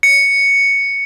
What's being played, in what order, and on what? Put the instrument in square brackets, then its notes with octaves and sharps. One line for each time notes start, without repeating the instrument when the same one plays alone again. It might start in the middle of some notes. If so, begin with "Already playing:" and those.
[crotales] C#7